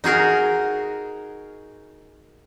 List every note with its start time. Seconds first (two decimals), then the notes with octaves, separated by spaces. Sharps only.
0.04 D#4 F#4 G#4 A#4